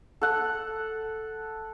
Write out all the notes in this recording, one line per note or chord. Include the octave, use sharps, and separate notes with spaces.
A4 F#5